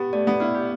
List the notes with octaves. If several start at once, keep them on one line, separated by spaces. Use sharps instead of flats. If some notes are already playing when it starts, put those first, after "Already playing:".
Already playing: B3 G4
A3 D5
B3
B3 E4
G4